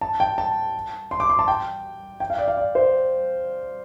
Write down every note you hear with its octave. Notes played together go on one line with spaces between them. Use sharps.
A5
G5
A5
C6
D6
C6
A5
G5
G5
F5
D5
F5
D5
C5